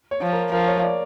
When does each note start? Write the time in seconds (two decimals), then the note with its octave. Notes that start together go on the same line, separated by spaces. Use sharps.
0.11 C#5
0.22 F3
0.32 A#4
0.52 F3 A#4
0.68 C#5
0.83 D5